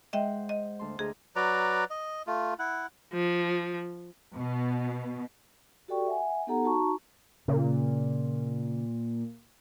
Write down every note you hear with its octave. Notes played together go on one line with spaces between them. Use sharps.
G#3 C5 D#5 E5 F#5 G5
D#5
D2 A5 C6
D2 G#4 D#5 A#5
F#3 B4 D5 A#5
D#5
A3 F4
E4 F#5
F3
B2
F#4 G4 A4 D5 G5 C#6
E5 F#5 G#5
B3 D#4 G4 A4 F#5 A#5
D#4 F#4 A5 A#5 C#6
A#2 C#3